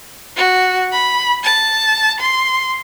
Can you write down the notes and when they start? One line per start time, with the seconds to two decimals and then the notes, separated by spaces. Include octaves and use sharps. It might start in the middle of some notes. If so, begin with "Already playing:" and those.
0.36 F#4
0.92 B5
1.43 A5
2.20 C6